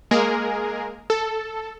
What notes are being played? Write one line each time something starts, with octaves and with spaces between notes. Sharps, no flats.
G#3 A#3 G#4 A#4
A4